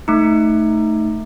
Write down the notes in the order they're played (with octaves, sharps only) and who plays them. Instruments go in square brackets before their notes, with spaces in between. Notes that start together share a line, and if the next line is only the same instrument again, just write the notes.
[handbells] A3 D#4